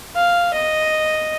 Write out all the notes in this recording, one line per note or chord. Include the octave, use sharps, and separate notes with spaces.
F5
D#5